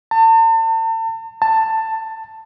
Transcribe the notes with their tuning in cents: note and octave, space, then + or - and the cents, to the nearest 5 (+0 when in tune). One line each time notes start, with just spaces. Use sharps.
A5 +40
A5 +15